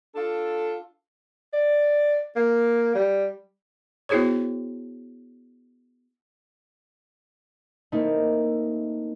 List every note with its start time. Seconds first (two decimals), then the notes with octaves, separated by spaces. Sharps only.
0.15 D4 F4 A4
1.53 D5
2.36 A#3
2.95 G3
4.09 B3 E4 F#4 G#4 C5 C#5
7.92 A3 A#3 C4 D#4 E4